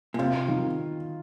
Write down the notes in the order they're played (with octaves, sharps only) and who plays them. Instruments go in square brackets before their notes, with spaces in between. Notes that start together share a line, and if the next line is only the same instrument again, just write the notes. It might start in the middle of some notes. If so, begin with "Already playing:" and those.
[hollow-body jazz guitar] A#2
[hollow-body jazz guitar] C3 [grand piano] F4
[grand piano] D#3